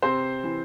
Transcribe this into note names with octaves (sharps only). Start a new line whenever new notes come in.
C3 C4 C5
E3